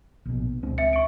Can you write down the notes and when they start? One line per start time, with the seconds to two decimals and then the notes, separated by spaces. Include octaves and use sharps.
0.25 A#1 B2
0.63 C#2 C4 D4
0.78 E5 C#7
0.93 C#6 D7